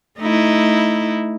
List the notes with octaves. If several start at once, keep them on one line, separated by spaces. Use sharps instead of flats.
A3 D#4 E4